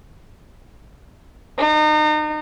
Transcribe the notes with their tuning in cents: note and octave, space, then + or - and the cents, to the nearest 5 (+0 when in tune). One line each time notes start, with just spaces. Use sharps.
D#4 -35